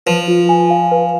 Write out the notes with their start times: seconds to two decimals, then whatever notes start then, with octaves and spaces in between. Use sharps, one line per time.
0.06 F3 B4
0.28 F4
0.49 G#5
0.70 F5
0.91 B4